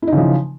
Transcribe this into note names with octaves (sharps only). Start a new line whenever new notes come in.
C#3 E3 F3 D#4 E4